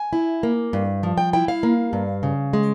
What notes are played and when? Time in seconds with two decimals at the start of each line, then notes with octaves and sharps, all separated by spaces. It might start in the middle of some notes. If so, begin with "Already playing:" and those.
Already playing: G#5
0.13 E4
0.43 A#3
0.73 G2
1.03 F3
1.18 G5
1.33 E4 G5
1.48 F5
1.63 A#3
1.93 G2
2.23 C#3
2.53 G#3